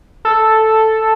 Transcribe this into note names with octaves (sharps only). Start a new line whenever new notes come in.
A4